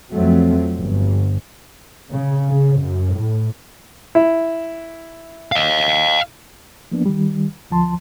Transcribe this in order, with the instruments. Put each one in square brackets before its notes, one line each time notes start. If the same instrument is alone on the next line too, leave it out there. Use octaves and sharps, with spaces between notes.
[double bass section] F2 F3 F#3 A3 C4
G1
C#3
C#3
F#2
A2
[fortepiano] E4
[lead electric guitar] D#5 F5
[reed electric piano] F3 A#3 B3 D4
D#3 G3
D2 F3 A5 C6